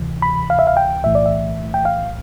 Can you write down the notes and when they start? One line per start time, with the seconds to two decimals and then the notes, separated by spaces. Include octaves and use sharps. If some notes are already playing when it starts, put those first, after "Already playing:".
Already playing: D2 C3 E3
0.22 B5
0.50 F5
0.59 E5
0.67 F5
0.77 G5
1.03 B1 A2 E3 A3 E5
1.15 D5
1.26 E5
1.74 G5
1.85 F5